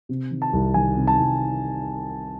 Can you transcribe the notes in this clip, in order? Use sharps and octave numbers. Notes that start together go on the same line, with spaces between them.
C3
D#3
A5
C2
D#3 G#5
C3
A5
C2